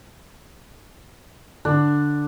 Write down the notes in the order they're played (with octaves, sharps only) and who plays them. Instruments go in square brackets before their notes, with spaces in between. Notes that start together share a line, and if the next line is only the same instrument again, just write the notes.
[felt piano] D3 [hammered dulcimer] D4